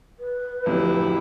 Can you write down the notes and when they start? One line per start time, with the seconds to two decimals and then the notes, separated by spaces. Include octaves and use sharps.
0.20 B4
0.66 D1 F2 E4 G4